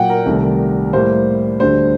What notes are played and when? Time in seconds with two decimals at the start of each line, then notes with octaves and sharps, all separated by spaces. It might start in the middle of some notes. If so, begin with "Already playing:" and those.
Already playing: A#2 F#3 A#3 F#5 G5
0.10 A#4
0.26 C2 C3 D#3 A3
0.93 A2 G3 A#3 C5
1.60 D2 D3 G3 C5